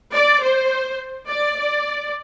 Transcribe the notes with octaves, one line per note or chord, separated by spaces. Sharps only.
D5
C5
D5
D5